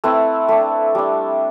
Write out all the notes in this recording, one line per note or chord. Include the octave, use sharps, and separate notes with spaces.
A3 C4 E4 B4
A3 D4
G3 D4